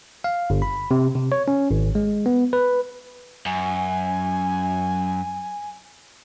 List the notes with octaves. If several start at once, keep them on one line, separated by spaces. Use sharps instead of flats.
F5
G1
B5
C3
C3
C#5
C#4
G#1
G#3
B3
B4
F#2 G#5